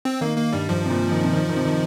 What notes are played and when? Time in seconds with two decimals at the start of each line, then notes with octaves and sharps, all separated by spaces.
0.05 C4
0.21 D#3 A#3
0.37 A#3
0.53 G2 G3
0.69 G2 F3
0.86 C3
0.90 A#2
1.11 D#3
1.24 C3
1.33 D#3
1.49 D#3
1.56 C3
1.65 D#3